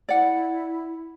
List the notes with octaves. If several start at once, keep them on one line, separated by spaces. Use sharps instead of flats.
E4 D5 F#5